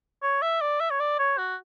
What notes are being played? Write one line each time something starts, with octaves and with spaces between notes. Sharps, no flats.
C#5
E5
D5
E5
C#5
D5
C#5
F#4